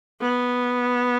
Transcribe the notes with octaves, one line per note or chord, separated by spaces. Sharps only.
B3